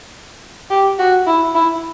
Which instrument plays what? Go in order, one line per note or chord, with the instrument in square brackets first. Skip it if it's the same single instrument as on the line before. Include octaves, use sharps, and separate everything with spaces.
[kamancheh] G4
F#4
E4
E4